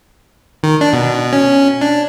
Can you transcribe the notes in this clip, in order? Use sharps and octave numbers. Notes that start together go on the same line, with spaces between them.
D#3
D4
B2
C#4
D4